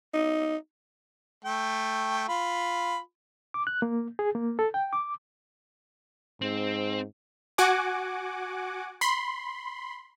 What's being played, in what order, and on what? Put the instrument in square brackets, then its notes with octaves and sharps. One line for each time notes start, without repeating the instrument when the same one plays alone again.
[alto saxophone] D#4
[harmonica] A3 G5
F4 B5
[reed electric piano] D6
F#6
A#3
G#4
A#3
A4
G5
D6
[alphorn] G#2 [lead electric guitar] C4
[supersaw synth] F#4 F#5 G#5 D6
B5 C6